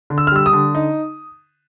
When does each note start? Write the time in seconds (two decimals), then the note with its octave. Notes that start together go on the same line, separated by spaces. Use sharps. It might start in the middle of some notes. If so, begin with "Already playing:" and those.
0.10 D3
0.18 E6
0.27 F6
0.32 G3 E6
0.46 D#6
0.53 D3
0.75 D#4